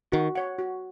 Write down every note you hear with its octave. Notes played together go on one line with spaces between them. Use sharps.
D#3 F#4
C#5 F#5
F#4